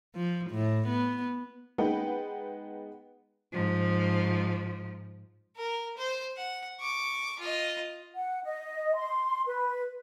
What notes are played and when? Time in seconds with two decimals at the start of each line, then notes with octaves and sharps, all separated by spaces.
0.16 F3
0.51 A2
0.88 B3
1.78 G#3 B3 D#4 B4 F#5 G5
3.52 G#2 F3
5.57 A#4
5.97 C5
6.37 F#5
6.80 C#6 D6
7.39 F4 D#5
8.16 F#5
8.44 D#5
8.95 C6
9.46 B4